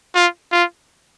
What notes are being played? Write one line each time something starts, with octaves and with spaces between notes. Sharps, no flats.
F4
F4